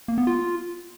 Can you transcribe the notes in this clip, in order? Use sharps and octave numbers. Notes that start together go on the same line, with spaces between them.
A#3
B3
F4